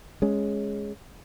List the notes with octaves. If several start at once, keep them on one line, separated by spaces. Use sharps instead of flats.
G#3 C#4